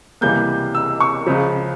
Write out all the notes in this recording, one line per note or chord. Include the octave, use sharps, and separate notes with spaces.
C#2 C3 E3 G3 A#3 G6
E6
C#6
C#2 C#3 F3